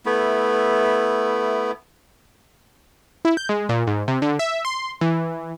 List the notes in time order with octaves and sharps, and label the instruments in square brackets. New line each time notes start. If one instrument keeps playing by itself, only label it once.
[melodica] A3 B3 E4
[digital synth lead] E4
G6
G#3
A#2
G#2
C3
D3
E5
C6
E3